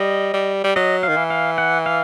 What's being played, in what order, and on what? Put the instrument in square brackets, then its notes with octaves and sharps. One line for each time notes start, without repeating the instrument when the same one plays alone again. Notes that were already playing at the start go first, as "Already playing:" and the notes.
Already playing: [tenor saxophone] G3 [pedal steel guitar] D#5
[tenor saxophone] G3
G3
[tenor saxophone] F#3 [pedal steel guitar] D#5
[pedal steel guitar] F5
[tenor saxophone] D#3
E3
[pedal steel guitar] F5
F#5
F5